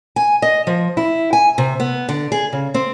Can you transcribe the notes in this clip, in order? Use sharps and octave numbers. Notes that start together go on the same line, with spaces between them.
G#5
D#5
F3
E4
G#5
C3
B3
D3
G#4
C#3
C4